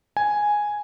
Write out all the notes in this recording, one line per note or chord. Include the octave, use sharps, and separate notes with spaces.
G#5